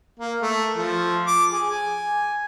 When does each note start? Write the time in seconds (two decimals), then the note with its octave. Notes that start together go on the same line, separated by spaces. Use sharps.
0.20 A#3
0.42 A3
0.77 F3
1.27 D6
1.52 G#4
1.70 G#5